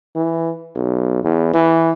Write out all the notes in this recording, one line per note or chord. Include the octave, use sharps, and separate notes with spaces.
E3
B1
E2
E3